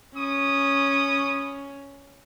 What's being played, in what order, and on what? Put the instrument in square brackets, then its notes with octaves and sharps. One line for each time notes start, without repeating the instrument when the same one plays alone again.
[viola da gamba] C#4 [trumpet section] B5 C#6 D#6